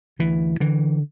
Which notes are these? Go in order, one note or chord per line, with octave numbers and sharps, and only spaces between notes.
D2 E3
D3 E3